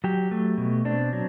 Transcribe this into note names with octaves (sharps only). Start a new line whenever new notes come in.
F#3 G4
A3
B2
C4 D4
F#3